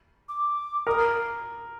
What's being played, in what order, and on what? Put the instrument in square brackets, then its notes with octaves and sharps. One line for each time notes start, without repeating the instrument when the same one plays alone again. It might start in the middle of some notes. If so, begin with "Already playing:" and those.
[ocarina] D6
[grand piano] A#4 [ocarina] D#6